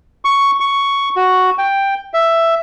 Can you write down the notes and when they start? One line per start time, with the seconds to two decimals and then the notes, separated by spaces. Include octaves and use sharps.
0.25 C#6
0.60 C#6
1.16 F#4
1.58 G5
2.14 E5